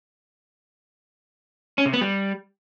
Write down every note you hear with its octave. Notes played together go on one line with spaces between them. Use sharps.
C#4
C3
B3
G3